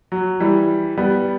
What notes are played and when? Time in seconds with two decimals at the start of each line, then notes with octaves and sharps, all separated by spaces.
0.12 F#3
0.40 E3 G3
0.98 G3 B3